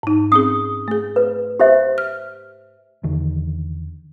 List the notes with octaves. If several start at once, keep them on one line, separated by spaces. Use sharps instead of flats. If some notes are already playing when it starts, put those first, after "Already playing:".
G#2 D#4
C4 C#4 G#4 D#6
A3 G#4
B4
G4 C5 E5
F6
E2 D3 D#3